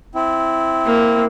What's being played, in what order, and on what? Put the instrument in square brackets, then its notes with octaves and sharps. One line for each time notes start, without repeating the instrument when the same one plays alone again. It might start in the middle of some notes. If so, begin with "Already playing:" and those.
[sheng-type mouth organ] C4 E4
[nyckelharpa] A#3